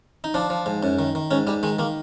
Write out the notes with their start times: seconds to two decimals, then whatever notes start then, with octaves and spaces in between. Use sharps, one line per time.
0.24 D#4
0.34 F3 D4
0.50 F3
0.66 G#2
0.83 F#2
0.99 D#3
1.15 D#3
1.31 G#2 C#4
1.47 G#2 G3
1.63 D#3 G#3
1.79 D#3 A#3